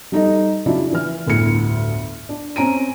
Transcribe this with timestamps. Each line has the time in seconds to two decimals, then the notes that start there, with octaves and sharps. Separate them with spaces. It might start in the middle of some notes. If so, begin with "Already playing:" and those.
0.12 G3 D#4 A4 D#5
0.66 C#3 F#3 D4 E4 F4
0.93 E3 F6
1.26 G1 D2 A2 C#7
2.29 D4
2.56 C4 C#4 A#5 D7 D#7